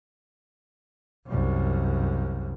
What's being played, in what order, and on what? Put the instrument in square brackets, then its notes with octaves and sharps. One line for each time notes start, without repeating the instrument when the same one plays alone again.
[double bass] C2 F#2